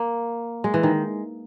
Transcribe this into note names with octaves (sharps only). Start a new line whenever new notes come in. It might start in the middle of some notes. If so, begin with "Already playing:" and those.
Already playing: A#3
G#3
E3
D#3